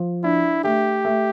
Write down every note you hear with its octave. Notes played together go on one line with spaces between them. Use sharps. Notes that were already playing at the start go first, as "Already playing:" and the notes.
Already playing: F3
D4 E4
A3 G4
A3